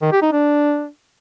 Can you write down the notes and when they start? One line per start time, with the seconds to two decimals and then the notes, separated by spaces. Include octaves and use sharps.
0.02 D#3
0.12 G4
0.22 D#4
0.32 D4